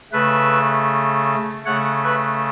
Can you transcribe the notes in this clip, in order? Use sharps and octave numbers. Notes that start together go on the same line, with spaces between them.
C#3 A3 B4 E5
C#3 A3 C#5 F#5
B4 E5